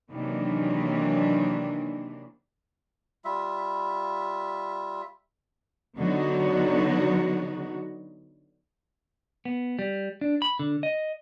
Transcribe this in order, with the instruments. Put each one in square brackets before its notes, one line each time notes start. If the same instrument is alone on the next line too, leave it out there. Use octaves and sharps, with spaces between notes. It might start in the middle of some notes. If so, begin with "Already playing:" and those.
[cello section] C3 D#3 E3 F#3 A#3 D4
[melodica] G3 F4 E5
[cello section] D3 F#3 B3 D#4 F#4
[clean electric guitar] B3
G3
D4
B5
D3
D#5